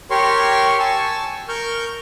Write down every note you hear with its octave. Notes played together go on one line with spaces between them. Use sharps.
G4 A#4 C#5 C6 C#6
G#5 A5 C#6 E6
A#4 C#6 F6 G6